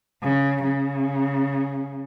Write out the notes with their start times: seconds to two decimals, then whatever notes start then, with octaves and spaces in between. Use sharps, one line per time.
0.22 C#3
0.63 C#3